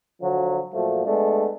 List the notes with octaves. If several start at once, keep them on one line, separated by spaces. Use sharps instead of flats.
D3 F3 F#3
A#2 F3 F#3 A3
G#3 A3 B3 D4